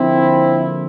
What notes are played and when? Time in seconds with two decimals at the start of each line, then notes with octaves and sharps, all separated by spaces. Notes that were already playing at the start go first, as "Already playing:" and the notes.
Already playing: D3 F3 A#3 C4 E4